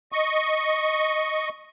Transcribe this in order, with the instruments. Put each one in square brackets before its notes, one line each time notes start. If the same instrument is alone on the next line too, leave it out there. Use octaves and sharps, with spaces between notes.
[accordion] D#5 C#6